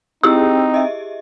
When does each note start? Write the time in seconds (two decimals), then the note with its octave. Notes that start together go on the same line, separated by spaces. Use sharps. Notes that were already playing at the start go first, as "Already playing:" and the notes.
0.23 C4 D#4 E4 G4 G#4 E6
0.74 D#5 E5